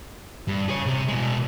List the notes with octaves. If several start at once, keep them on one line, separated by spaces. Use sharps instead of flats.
G2
G#4 C#5
C3
B2 G#3